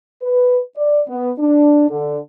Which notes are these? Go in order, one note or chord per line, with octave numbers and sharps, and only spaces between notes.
B4
D5
B3
D4
D3